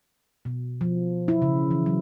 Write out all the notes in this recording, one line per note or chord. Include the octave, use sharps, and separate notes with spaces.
B2
F3
E4
C#3
E3
F#3